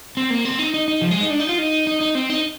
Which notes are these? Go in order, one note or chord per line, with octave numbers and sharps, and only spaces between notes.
C4
A#3
C4
D#4
D#4
D#4
F3
G#3
D#4
D4
D#4
F4
D#4
D#4
D#4
C4
D#4